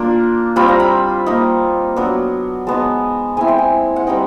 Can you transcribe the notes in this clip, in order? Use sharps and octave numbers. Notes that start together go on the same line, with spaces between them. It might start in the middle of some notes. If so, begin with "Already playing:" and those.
Already playing: A#3 D4 F4
G3 C4 F4 B5
A#5
B5
A#3 D#4
F#3 B3 D4
G#3 B3 D#4 A5
G#3 C4 E4 G#5
G5
G#5
F#5
G3 C4 D#4 G5